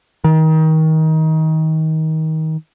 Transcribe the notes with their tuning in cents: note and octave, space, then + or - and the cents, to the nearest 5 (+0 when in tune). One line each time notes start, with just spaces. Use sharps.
D#3 +25